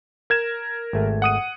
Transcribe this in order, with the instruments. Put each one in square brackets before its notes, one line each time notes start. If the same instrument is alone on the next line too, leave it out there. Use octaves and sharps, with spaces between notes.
[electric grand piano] A#4 G#6 E7
[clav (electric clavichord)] G#1 A3
[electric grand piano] F#5 D#6 D#7